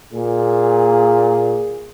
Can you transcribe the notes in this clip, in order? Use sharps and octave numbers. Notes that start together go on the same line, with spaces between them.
A#2 G#4